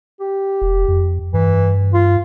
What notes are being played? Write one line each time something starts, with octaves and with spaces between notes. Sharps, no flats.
G4
E1
F2
G2 E3
F4